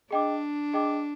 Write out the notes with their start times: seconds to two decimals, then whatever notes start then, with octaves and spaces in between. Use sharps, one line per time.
0.11 D4 G#4 D#5 G5 D6
0.74 G#4 D#5 G5 D6